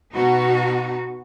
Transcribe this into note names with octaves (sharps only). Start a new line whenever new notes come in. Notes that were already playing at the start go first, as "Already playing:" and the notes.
B2 D#4 F#4